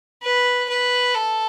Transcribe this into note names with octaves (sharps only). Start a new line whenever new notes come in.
B4
B4
A4